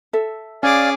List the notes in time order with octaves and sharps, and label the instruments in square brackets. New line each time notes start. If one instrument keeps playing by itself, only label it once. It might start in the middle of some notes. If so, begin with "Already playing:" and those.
[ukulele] A4 E5
[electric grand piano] C#4 [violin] G#4 D6 [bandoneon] D5 F5 G#5